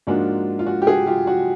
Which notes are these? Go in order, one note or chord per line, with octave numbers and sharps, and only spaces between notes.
G#2 F3 A#3 D4 F4 F#4
F4
F#4
G4
F#4 G#4
F4 G4
F#4